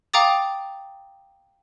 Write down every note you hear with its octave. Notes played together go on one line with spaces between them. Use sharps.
F5 G5 A#5 D6 D#6 A6